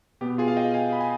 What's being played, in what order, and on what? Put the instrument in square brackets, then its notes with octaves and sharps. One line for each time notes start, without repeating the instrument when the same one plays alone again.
[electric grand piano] B2 B3 G4
F4 G#4
F5
D#5 G5
F5 G#5
B5
G#5